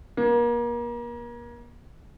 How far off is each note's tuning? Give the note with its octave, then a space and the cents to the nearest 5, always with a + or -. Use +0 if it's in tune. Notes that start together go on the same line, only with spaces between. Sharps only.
A#3 +35